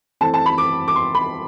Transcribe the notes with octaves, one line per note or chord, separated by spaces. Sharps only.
E3 A3 C4 A5
A5
B5
D6
D6
C6
B5